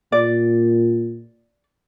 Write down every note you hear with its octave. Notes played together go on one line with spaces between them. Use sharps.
A#2 D5